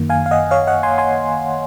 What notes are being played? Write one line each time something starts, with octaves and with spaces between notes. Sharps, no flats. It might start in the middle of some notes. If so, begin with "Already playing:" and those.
Already playing: F#2 D#3 A#3
F5 G#5
F5
D#5 F#5
C#5 F5
D#5 F#5
G#5 C6
G#5 C6